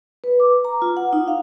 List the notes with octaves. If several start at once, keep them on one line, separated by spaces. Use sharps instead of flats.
B4
D6
A#5
F4
F#5
D#4
F5